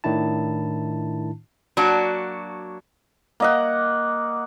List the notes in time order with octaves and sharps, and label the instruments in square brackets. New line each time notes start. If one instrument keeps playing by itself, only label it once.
[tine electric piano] A2 D#3 D4 E4 A5
[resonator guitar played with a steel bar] F#3 A#3 D4 F#4
[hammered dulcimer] A#3 D#5 F#5